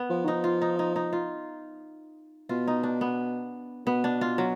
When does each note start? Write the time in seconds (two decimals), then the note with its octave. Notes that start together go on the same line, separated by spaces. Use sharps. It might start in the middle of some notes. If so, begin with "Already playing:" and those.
Already playing: B3
0.10 F3
0.24 D#3
0.27 F3 D#4
0.44 F4
0.62 D#4
0.79 D#4
0.96 D#4
1.13 F4
2.49 B2 F4
2.68 D#4
2.83 D4
3.01 B3
3.86 B2 B3
4.04 D4
4.21 F4
4.38 F#3